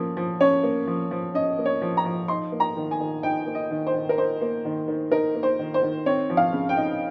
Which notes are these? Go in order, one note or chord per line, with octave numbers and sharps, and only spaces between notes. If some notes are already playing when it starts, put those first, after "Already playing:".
Already playing: F3 A#3 C#4
F3
C#4 C#5
A#3
F3
F3
C#4 D#5
A#3
C#5
F3
A#5
F3
D#4 C6
A#3
A#5
D#3
G#5
D#3
D#4 G5
A#3
D#5
D#3
C5
D#3
A#4
D#4 C5
A#3
D#3
D#3
D#4 A#4
A#3
C5
D#3
C5
D#3
C4 C#5
F3
F5
C#3
G5
D#4